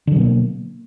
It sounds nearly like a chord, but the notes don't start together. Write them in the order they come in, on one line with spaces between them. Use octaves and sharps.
D3 F#3 B2 A#3